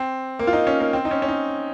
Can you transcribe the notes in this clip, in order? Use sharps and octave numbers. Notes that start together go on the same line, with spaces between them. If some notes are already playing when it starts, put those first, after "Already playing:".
Already playing: C4
A#3
F4
D#4
C#4
A#3
C4
D#4
C#4
C#4
D#4